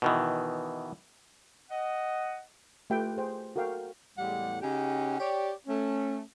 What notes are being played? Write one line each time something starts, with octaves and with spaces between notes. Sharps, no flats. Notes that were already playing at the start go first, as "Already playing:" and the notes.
B2 D#3 E3
D#5 F#5
A3 F4 G4 B4 E5 G5
G#4 C5 G5
F#4 A4 A#4 F5 G5
E2 A2 G3 G#3 G4 F#5
C#3 C#4 D#4 F#4 G4
G4 C#5 D5
A3 C#4